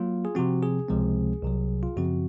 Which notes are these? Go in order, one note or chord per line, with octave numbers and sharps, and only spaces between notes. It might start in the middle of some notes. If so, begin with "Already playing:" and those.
Already playing: F#3 A#3 F4
G#4
C3 F3 C4 F#4
G#4
C#2 C3 F3 G#3 C4
C2 C3 F#3
F4
F#2 C#3 F3 C4 F#4